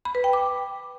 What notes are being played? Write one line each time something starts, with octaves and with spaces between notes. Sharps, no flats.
B5
B4
G5
D6